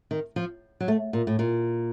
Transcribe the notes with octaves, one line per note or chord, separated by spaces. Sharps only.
D#3
F3
F#3
A3
A#2
A2
A#2